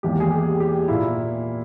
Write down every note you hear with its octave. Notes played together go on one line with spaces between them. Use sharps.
E1 E2 D#3 A#3 G4
G#4
G4
G4
A#2 A#3 E4